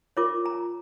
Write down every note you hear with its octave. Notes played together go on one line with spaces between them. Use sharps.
F4 A#4 C#5 D6
A#5